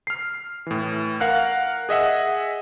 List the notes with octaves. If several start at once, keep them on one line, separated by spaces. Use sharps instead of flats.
F6 C7
A2 E3
A#4 F5 F#5 F#6
G#4 D#5 E5 F#5